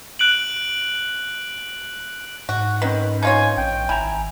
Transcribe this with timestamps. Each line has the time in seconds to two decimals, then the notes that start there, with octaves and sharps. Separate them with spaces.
0.19 F#6 D7 F#7
2.49 G#2 F#4
2.82 D#3 C4 C#4 B4
3.23 D#4 F4 C#5 G#5
3.57 A#1 G5
3.89 G#1 E4 G#5 A#5